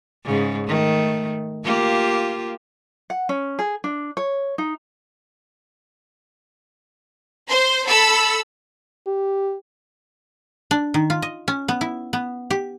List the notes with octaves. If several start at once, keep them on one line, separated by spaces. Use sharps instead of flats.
G#2 C#3
D#3 A3
A#3 F4 G4
F#5
C#4
G#4
D4
C#5
D#4
C5 C6
A4 B5 E6
G4
D4
D#3
F4
D#5
C#4
B3
E4
B3
G4